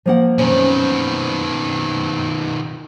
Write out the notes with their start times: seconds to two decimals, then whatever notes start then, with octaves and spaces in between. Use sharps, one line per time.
0.06 F3 A#3 F#5
0.39 F#2 B2 D#3 C4 C#4